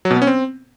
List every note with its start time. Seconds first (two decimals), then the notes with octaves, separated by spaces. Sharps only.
0.05 F#3
0.11 B2
0.16 B3
0.22 C#4
0.27 C4